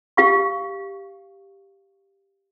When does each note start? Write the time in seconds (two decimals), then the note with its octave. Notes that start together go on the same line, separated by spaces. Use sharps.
0.17 G4 F5 C#6